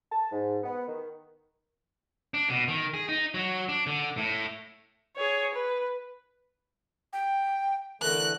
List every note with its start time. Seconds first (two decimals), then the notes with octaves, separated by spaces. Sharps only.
0.12 A5
0.32 G#2
0.64 B3
0.88 D#3
2.34 D4
2.49 B2
2.68 D#3
2.94 G#4
3.09 D#4
3.34 F#3
3.69 D4
3.87 D3
4.17 A2
5.16 G#4 C#5
5.54 B4
7.13 G5
8.02 D3 E3 A3 A#4 F#6